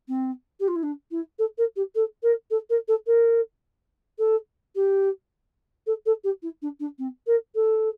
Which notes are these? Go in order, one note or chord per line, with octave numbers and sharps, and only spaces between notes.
C4
G4
F4
E4
D4
E4
A4
A#4
G4
A4
A#4
A4
A#4
A4
A#4
A4
G4
A4
A4
G4
E4
D4
D4
C4
A#4
A4